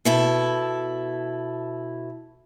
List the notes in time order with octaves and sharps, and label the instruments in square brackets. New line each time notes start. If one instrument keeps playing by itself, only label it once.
[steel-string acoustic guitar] B2 E4 A4